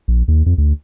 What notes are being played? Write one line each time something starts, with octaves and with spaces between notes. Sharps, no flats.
A#1
D#2
F2
D2